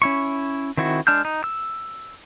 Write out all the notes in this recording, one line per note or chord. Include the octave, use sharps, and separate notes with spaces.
C#4 E4 C#6
D#3 C4 E4 F#4
G#3 D4 A5 F6 G6
D#4
E6